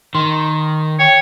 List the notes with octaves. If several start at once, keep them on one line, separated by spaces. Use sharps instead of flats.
D#3 C6
C#5 G5